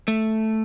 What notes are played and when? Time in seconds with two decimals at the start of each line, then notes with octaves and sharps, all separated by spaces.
0.08 A3